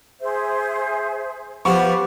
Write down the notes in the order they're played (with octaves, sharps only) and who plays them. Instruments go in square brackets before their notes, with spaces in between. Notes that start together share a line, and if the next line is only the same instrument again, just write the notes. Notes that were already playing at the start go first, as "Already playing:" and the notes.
[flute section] G#4 C5 E5
[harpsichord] F3 B3 [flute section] F4 B4 [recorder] G4 [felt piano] C#6